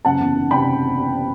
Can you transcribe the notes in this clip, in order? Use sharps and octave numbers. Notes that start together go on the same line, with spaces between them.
F#1 F#5 A5
E2
D#3
C3 G5 B5